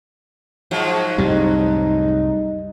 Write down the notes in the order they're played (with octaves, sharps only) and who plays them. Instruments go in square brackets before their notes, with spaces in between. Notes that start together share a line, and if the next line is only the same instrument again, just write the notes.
[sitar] G#2 F3 F#3
[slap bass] C2 F#2 A2 [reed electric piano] G3 [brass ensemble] D#4